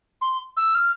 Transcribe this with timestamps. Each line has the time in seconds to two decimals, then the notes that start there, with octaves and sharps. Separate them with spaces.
0.21 C6
0.57 E6
0.75 F6